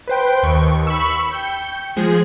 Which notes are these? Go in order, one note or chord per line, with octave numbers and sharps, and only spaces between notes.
B4 C5 G5
D#2 C#6
B5 C#6 E6
G5 G6 C#7
F3 G#3 G#4